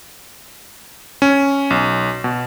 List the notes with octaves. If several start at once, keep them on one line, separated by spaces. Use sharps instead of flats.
C#4
B1
B2